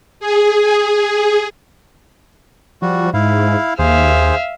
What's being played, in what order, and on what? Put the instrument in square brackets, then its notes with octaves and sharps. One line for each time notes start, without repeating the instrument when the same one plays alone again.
[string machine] G#4
[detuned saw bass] F3 [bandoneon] G3 F#4
[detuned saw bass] G#2 [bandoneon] E4 F5
[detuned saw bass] D#2 [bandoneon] G#4 C5 [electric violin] E5 F5